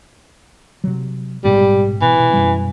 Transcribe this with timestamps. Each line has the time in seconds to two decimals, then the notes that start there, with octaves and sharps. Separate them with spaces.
0.84 C3 F#3
1.44 A#1 G#2 B2 G3
2.02 B2 E3
2.19 B2
2.33 F#2 B2 G3